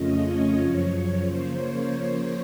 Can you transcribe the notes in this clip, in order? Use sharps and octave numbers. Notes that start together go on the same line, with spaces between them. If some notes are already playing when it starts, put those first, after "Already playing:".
Already playing: F2 C#3 A3 C#4 F4 D#5
C#5
F#2 C#3 F3
C#3 F3 A#3 C5
C#5